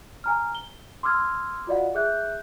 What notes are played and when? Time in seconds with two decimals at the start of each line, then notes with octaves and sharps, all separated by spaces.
0.24 G#5 A#5 F6
0.55 G7
1.03 C6 D6 E6 F6 G#6
1.67 F4 F#4 D5 D#5 F5 F#5
1.95 G#4 E5 F#6 G6